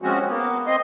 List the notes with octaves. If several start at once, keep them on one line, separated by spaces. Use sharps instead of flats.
F3 G#3 C4 C#4 F#4
A#3 B3
C4 D#5 C6